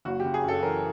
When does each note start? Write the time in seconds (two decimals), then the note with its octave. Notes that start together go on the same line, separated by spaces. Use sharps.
0.05 F#1 F#4
0.20 C#3 G4
0.34 G#4
0.44 F#2 A4
0.63 E3 A#4